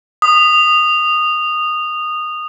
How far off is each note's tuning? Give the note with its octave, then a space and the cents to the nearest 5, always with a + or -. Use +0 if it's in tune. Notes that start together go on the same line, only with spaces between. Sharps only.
D#6 -15